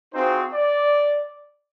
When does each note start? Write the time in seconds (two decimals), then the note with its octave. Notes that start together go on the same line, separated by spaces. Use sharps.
0.14 C4 D#4 F4 F#4 G#4 C5
0.53 D5